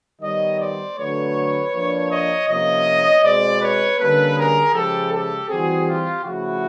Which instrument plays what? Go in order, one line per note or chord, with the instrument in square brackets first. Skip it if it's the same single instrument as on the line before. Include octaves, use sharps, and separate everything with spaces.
[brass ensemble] D#3 G3 B3 C#5 D#5
C5 D5
D3 F#3 A3 B4 C#5
F3 A#3 D4
C#5 D#5
C3 F3 A#3 C#4 C#5 D#5
B2 G#3 C4 C5 D5
B4 C#5
D3 G3 A#3 C#4 A4 B4
G#4 A#4
C#3 F3 G#3 G4 A4
G4 A4
E3 G3 C4 F#4 G#4
F4 G4
C#3 F3 A3 E4 F#4